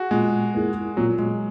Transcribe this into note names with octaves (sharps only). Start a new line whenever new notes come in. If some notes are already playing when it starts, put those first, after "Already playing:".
Already playing: F#4 G#4
A#2 G#3
A#3 E4 G#4
A#2 F#3
G#3